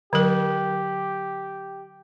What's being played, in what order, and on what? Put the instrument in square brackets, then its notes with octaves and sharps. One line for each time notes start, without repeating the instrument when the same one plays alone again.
[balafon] D3 F#3 A#4 [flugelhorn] G4